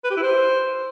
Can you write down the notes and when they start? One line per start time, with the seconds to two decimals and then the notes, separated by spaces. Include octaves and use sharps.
0.04 B4
0.11 G4
0.17 E4
0.23 C5